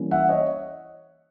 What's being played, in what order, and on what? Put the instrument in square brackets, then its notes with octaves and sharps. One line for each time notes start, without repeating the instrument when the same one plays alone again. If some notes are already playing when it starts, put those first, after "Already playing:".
Already playing: [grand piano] E3 G3 A#3 C#4
E5 F#5
C#5 D#5